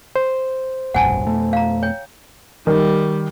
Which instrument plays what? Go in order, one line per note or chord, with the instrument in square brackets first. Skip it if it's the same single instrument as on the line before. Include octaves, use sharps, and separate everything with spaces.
[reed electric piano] C5
[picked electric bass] F1 B1 G2 [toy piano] F#5 G#5 A5
[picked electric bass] F2 B2 A3
[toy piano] F5 A#5
C#5 G5
[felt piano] D#3 [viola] G3